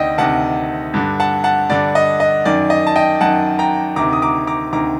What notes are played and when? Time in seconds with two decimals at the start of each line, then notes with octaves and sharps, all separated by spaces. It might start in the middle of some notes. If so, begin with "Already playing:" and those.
Already playing: D2 C3 D#3 D5 D#5 F#5 G5
0.18 D2 C3 D#3 F#5 A5
0.94 G2 D3
1.20 F#5 A5
1.44 F#5 A5
1.70 G2 D3 D5
1.95 D#5
2.20 D#5
2.45 F#2 D#3 D5
2.70 D#5
2.87 A5
2.96 D#5 G5
3.21 F#2 D#3 F#5 A5
3.59 G5 A#5
3.96 D2 C3 D#3 A#5 D6
4.13 D#6
4.22 A#5 D6
4.47 A#5 D6
4.72 D2 C3 D#3 A#5 D6